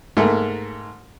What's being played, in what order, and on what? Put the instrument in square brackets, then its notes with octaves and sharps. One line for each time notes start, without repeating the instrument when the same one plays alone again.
[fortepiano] G#2 A3 A#3